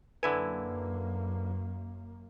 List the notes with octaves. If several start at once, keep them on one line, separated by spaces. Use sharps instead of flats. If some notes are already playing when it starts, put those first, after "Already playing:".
F#2 D3 A#3 E4 B4 G#5